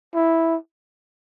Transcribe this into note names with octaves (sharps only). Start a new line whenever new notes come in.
E4